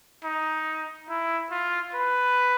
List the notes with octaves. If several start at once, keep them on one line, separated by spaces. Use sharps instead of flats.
D#4
E4
F4
B4